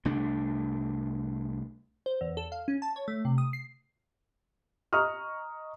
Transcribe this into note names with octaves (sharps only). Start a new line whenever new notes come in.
C2 A3 D4
C5
E2
A4
F5
C#4
A5
C#5
A3
C3
D#6
C7
D#5 A#5 C#6 D#6 F6